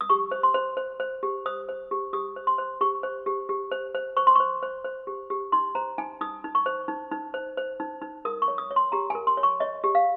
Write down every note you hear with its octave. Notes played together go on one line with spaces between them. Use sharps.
D#6
G4 C#6
C5
C6
C5
C5
C5
G4
C5 D#6
C5
G4
G4 D#6
C5
C6
C5
G4 C#6
C5
G4
G4
C5
C5
C5 C#6
C6
C5 C#6
C5
C5
G4
G4
D#4 C6
C5 A#5
D#4 G#5
D#4 D#6
D#4
C#6
C5
D#4
D#4
C5
C5
D#4
D#4
A#4 D#6
C#6
C#5
D#6
C#5
C6
G4 A#5
A#4 G#5
C6
C#5
C#6
C#5 D#5
G4
F5